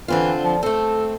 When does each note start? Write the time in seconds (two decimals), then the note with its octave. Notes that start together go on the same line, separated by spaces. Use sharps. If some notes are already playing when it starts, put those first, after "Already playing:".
0.08 D3 E3 C4 F4
0.44 F3
0.63 A3 C4 A4